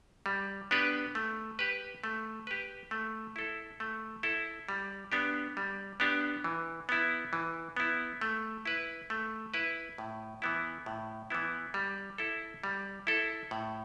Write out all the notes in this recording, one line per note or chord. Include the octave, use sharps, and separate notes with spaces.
G3
B3 D4 G4 B4
A3
G4 B4
A3
G4 B4
A3
E4 A4
A3
E4 A4
G3
B3 D4 G4
G3
B3 D4 G4
E3
B3 E4
E3
B3 E4
A3
E4 B4
A3
E4 B4
A2
E3 B3 E4
A2
E3 B3 E4
G3
E4 A4
G3
E4 A4
A2